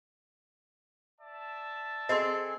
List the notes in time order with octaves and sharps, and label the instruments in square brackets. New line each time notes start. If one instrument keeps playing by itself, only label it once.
[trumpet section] D5 E5 A5
[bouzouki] C4 G#4 A4 [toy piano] D#5 B5 C6